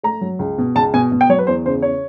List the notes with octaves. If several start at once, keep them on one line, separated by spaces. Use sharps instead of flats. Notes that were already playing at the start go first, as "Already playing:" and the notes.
A3 A#5
F#3
C#2
B2
C#2 A5
B2 G#5
B2
G5
F#3 C#5
B4
E2 C5
C#3 C5
C#3 C#5